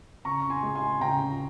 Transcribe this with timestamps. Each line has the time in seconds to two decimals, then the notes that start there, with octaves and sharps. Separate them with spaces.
0.25 C#3 A#5 C#6
0.42 C#6
0.50 G#5 C6
0.63 G#3
0.75 G#5 C6
1.01 C#3 G5 A#5